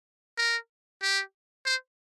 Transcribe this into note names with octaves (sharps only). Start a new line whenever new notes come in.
A#4
G4
C5